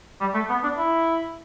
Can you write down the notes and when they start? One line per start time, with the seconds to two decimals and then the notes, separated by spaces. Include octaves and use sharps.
0.21 G3
0.34 A3
0.50 B3
0.64 D4
0.77 E4